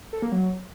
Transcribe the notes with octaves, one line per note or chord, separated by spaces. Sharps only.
A4
A#3
F#3